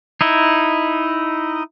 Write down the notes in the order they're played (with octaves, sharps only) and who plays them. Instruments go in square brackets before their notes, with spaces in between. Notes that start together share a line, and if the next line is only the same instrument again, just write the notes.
[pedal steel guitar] D#4 E4 D#5